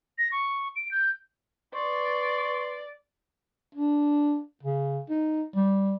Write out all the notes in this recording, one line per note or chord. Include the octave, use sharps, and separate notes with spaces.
A#6
C#6
D7
G6
B4 D5 C6 C#6
D4
C#3
D#4
G3